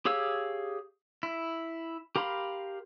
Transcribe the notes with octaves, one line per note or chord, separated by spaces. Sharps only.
G4 G#4 C#5 F5 E6
E4
G4 A#4 F5 B5 C6